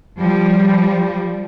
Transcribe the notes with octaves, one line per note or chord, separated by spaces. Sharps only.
F3 G3